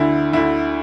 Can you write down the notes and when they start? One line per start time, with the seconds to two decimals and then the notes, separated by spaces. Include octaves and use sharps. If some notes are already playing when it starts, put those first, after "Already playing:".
Already playing: D2 D3 E4
0.33 D2 D3 E4